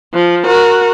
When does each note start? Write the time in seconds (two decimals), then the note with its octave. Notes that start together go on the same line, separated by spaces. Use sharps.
0.14 F3
0.45 F#4 A#4